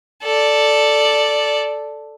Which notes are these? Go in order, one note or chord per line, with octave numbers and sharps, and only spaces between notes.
A4 D5